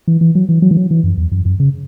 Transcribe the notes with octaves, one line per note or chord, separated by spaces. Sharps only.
E3
E3
F#3
E3
F#3
E3
F#3
E3
F#2
E2
F#2
F#2
C#3